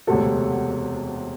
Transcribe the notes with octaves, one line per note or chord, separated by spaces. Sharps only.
E1 D2 C3 A4